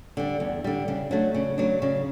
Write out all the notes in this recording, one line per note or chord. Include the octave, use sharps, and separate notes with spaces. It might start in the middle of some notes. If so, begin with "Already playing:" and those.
D3 G3
E2
D3 G3
C#3
F#3 A3 D4
C#3
F#3 A3 D4
C#3